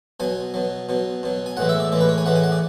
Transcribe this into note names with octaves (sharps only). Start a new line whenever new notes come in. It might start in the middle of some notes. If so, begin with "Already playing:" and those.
B2 F#3 G#5
B2 F#3
B2 F#3
B2 F#3
G#5
A2 E3 G#3 F#5
E5
D5
A2 E3 G#3 D5
B4
C#5
G#5
A2 E3 G#3 F#5
G#5
F#5
D5